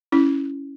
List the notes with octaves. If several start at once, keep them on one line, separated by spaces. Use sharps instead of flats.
C#4 E4